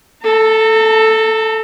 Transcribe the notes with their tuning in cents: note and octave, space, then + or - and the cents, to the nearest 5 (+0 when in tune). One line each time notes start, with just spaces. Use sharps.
A4 +0 A#5 -45